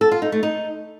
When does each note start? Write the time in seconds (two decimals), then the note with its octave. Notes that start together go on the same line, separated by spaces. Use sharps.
0.01 A4
0.11 F4
0.22 D#4
0.32 A3
0.43 D#4